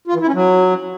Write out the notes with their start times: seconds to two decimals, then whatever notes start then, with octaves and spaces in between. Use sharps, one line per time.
0.08 F4
0.14 E3
0.21 E4
0.27 C#4
0.34 F#3